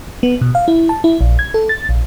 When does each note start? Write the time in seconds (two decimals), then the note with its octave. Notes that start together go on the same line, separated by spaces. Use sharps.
0.23 B3
0.41 B2
0.55 F5
0.68 E4
0.89 A5
1.04 E4
1.21 A#1
1.39 G#6
1.54 A4
1.69 A6
1.89 A#1